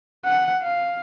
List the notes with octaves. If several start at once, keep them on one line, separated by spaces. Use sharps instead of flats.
F#5
F5